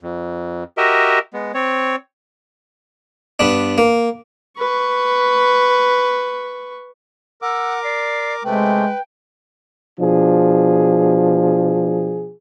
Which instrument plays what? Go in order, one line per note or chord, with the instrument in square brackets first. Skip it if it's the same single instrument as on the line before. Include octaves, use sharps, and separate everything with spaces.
[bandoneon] F2
F#4 G4 A#4 D#5 E5
G#3 B3
C4 C#5
[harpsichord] G2 B3 D4
A#3
[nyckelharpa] B4 C#6
[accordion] A#4 D6 [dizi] F#5 [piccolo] E6
[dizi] D5 [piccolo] C7
[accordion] C3 A3 [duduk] G#3 [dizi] B4 [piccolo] G5
[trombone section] B2 F3 D4 G#4